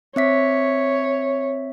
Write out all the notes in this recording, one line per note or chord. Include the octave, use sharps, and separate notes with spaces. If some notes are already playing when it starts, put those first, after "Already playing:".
C4 C#5 E5 B6